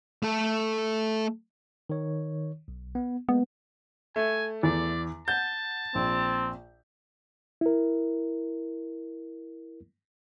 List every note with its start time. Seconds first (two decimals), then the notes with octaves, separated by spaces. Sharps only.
0.23 A3 A4
1.90 D#3 C#5
2.68 B1
2.95 B3
3.29 G#3 A#3 B3
4.16 A3 G#5
4.63 E2 D5
5.28 F#5 A5 G6
5.95 A#1 C4
7.61 E4 A#4